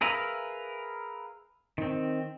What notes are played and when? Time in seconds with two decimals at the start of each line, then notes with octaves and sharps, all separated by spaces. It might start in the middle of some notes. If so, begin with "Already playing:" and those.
0.01 G#4 A#4 B4 E5 F5
1.78 D#3 C4